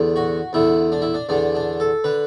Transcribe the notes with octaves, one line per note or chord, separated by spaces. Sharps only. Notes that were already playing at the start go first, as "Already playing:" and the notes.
Already playing: E2 D3
F#4
E2 D3 E4
D4
E4
D4
E2 D3 D4
D4
A4
D3 B4